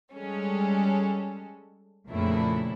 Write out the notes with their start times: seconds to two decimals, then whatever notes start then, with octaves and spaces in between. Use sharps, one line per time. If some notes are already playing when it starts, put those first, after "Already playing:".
0.12 G3 G#3 C#4 A4
2.07 F2 A#2 C#3 A3 D4 E4